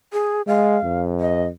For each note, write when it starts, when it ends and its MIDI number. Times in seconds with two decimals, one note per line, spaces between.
0.13 0.42 68
0.47 0.78 56
0.47 1.00 77
0.83 1.49 41
1.20 1.45 75